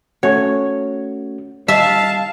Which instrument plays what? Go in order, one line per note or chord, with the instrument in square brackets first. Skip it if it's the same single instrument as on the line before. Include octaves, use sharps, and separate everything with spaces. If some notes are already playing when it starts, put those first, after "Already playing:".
[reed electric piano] A3 C#4 F#4 [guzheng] C#5
[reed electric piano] G3 [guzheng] E5 [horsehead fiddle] F5 [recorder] A5